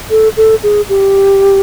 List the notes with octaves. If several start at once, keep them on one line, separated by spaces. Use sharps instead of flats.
A4
A4
G#4
G4